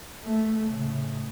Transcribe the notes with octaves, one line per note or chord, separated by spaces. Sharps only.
A3
A2 C#3